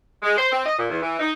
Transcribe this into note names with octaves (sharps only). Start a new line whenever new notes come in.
G#3
C5
C4
D#5
A#2
E2
E3
D#4